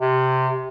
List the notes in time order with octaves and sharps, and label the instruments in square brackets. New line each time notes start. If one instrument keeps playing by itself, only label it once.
[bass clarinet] C3